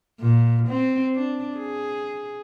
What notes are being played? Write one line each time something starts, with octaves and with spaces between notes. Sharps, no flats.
A#2
C4
D4
G#4